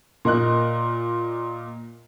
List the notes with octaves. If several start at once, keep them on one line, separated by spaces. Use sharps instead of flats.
A#2 A#4 D#5 F#6